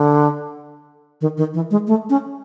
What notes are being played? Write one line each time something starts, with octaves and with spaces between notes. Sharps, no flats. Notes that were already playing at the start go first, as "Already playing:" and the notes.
Already playing: D3
D#3
D#3
E3
G#3
A3
C#4